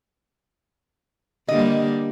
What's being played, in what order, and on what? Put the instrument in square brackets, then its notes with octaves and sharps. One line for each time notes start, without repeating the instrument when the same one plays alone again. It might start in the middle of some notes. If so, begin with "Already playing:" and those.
[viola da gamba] D3 G3 A#3 [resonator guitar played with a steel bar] D#5